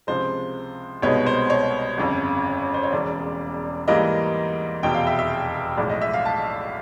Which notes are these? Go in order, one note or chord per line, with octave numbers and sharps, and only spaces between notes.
C#2 C3 F3 G#3 C5
C2 B2 G#3 B3 D#4 C#5
C5
C#5
G1 F2 C#3
C5
C#5
E1 E2 C#3 D5
G#2 E3 G3 A#3 D#4 D#5
F1 E2 B2 G5
F5
E5
E5
B1 A2 F3 G#3 D5
D#5
E5
F5
A5